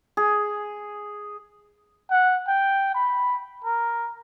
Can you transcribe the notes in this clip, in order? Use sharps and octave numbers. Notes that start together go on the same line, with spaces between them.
G#4
F#5
G5
B5
A#4